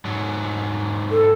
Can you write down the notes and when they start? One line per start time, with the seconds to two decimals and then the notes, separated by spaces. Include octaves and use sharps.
0.05 G#2 F#3
1.11 A4